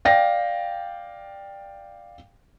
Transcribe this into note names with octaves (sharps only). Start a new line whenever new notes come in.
D5 F5 G5 A#6